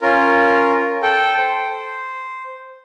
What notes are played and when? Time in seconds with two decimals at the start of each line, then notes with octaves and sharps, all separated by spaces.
0.02 C#4 F4 A#4
1.02 A4 G5
1.38 C5